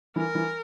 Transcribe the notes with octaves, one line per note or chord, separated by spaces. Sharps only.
E3 A#4
E3